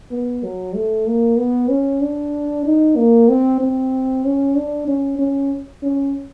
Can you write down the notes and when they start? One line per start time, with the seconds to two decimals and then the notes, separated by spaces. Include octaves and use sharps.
0.11 B3
0.44 F#3
0.75 A3
1.07 A#3
1.38 B3
1.70 C#4
2.02 D4
2.66 D#4
2.97 A#3
3.29 C4
3.60 C4
4.25 C#4
4.56 D4
4.88 C#4
5.19 C#4
5.83 C#4